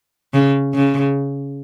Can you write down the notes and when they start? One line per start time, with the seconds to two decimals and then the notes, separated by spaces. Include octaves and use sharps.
0.34 C#3
0.75 C#3